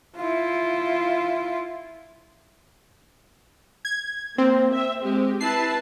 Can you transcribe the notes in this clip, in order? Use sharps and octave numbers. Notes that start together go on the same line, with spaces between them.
E4 F4
G#6
A#3 C4
E5
G#3 G4
E4 B4 A5 C7